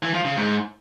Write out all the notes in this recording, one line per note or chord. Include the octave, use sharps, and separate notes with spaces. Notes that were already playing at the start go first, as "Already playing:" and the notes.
E3
F3
C#3
G#2